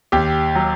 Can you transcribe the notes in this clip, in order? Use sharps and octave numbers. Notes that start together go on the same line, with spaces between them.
D#2 G4
F#3